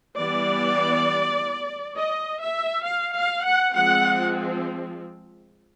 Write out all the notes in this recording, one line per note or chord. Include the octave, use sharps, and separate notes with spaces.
E3 G3 B3 D5
D#5
E5
F5
F5
F#5
F3 G#3 C4 F#5